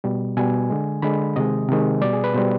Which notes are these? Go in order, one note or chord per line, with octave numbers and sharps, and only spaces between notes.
B2 G3
B2 G3 G#5
D3 G#3
D3 G#3 B5
C3 D#3 G#3 D#5
C3 D#3 G#3
B2 G3 D5
G#4
B4
B2 G3 C5